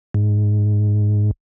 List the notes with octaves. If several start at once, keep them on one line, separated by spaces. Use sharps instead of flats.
G#2